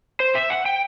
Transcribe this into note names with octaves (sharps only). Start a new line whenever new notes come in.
C5
E5
F#5
G5